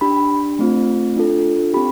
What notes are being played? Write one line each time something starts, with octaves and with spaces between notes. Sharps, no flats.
D4 G4 B5
A3 C4 F4
D4 F4 A4
C4 G4 B5